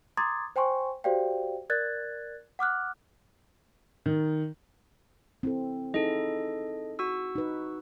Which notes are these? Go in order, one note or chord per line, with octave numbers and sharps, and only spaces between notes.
A#5 C6 D6 D#6 G#6 A6
C5 G5 G#5 C6 C#6
F#4 G4 C5 D5 F5 G5
A#4 D5 F#6 G#6 A6
F#5 D6 F6 F#6
D#3
C4 E4 A4
D#4 E4 G#4 A4 D#5
F#4 C#6 E6
D#4 B4